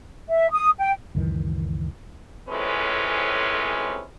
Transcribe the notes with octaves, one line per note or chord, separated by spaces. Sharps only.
E5
D#6
G5
C#2 F#2 D#3 E3
F2 A2 C3 G#3 C#4 B4